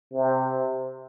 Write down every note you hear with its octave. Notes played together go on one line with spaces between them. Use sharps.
C3